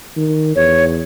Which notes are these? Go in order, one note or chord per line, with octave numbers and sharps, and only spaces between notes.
D#3
E2 C#5